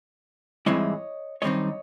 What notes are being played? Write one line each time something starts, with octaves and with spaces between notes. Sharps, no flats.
G#2 E3 G3 C4 E4 C#5 D#5
F#2 D#3 G3 C4 D#4 C#5 D#5